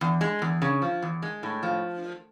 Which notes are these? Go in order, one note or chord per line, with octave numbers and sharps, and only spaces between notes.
E2
G#3
E2
C#3
F3
E2
G#3
A2
F3